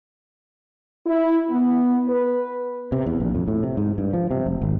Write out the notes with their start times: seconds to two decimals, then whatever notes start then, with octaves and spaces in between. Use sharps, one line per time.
1.05 E4
1.50 B3
2.07 B4
2.92 C3
3.06 E2
3.20 A#1
3.35 F2
3.48 A2
3.63 C3
3.77 G#2
3.98 G2
4.13 F3
4.31 C3
4.46 F1
4.62 G#1